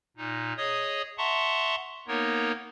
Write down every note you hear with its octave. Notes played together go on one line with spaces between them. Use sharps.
A#2 D#4
G#4 C#5 D#5 D#6
E5 F#5 A5 A#5 C6 C#6
A#3 B3 D#4 A#4 C#5